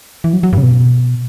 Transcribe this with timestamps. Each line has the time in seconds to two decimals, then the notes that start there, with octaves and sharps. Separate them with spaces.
0.24 E3
0.33 F#3
0.43 F#3
0.53 G2
0.58 C#3
0.63 B2